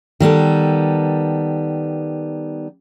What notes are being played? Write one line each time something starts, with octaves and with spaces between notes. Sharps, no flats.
D#3 G3 B3 A4